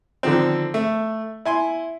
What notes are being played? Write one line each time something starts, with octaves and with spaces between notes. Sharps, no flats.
D3 D#3 F3 C4
A3
E4 G#5 C6